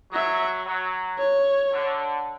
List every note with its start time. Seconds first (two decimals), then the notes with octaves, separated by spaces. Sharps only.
0.12 F#3 E5
0.65 F#3
1.18 C#5
1.71 D3